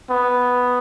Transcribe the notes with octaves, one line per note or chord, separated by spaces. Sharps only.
B3